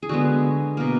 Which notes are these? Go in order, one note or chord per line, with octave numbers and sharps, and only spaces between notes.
G#4
D3 G#3 B3 F#4
B2 A#3